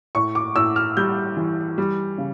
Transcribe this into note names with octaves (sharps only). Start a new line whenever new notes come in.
A2 C#6
D6
A2 E6
F6
G3 G6
E3
G3
C#3